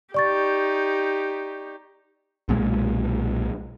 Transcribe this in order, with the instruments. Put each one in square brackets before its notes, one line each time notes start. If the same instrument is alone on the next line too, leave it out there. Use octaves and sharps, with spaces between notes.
[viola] D#4 G4 [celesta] D5 C#6 A6
[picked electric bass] B1 A#2 F3 G#3